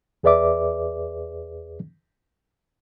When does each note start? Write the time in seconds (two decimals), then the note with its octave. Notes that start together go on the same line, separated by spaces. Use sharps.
0.23 E2 G#4 B4 D5 E5 D6